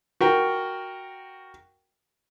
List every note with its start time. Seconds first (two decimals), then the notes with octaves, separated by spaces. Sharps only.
0.21 F#4 A#4 G5